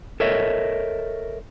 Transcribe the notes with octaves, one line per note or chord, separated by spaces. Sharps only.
A4 A#4 C#5 D#5 E5